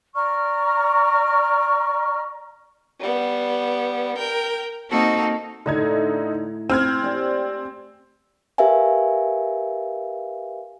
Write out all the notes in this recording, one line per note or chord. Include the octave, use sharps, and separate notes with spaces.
D5 A#5 C#6 F6
G3 B3
A#4 G5
A#3 C4 D#4 F#4 A4
A2 D3 D#4 A#5 G#6
C4 F6 G#6
G4 D5 G#5
G4 A#4 B4 E5 F5 G#5